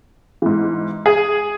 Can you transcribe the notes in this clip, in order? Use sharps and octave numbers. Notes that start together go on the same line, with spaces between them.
G#2 E3
G#4